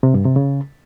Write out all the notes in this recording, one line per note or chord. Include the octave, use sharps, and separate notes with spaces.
C3
G2
C3
C#3